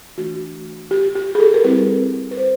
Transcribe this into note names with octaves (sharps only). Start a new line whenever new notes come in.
E3 A3 D4 F#4
G4
G4
G#4
A4
A#4
G3 C4 E4 B4
B4
C5